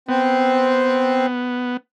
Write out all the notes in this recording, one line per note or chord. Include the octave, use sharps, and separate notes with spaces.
B3 C4